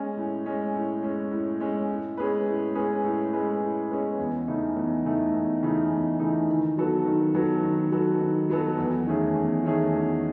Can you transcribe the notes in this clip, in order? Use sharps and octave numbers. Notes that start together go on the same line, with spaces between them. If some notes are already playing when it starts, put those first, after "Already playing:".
Already playing: G#3 C#4
A2
G#3 C#4
A2
G#3 C#4
A2
G#3 C#4
A2
G#3 C#4 G#4 B4
A2
G#3 C#4 G#4 B4
A2
G#3 C#4 G#4 B4
A2
G#3 C#4 G#4 B4
E2
C#3 E3 A3 D#4
E2
C#3 E3 A3 D#4
E2
C#3 E3 A3 D#4
E2
C#3 E3 A3 D#4
D#3
F#3 B3 F#4 A4
D#3
F#3 B3 F#4 A4
D#3
F#3 B3 F#4 A4
D#3
F#3 B3 F#4 A4
E2
D#3 A3 C#4 G#4
E2
D#3 A3 C#4 G#4
E2